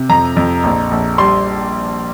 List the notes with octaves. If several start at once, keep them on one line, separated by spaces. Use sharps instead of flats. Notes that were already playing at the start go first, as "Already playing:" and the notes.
Already playing: C3
F2 A#5
F2
A#1
A#1
G3 C6